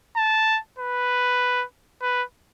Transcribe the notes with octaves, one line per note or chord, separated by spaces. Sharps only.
A5
B4
B4